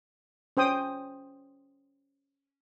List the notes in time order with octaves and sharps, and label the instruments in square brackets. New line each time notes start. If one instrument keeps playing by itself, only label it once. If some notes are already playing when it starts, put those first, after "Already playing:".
[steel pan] C#4 C5 G5 D#6